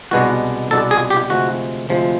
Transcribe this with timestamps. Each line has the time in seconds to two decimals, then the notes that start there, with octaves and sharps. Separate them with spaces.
0.11 C2 B2 G#3 B3 D4 F#4
0.71 C2 B2 G#3 B3 D4 A4
0.91 G#4
1.10 G4
1.30 D2 C3 F3 G#3 F#4
1.89 D2 C3 F3 G#3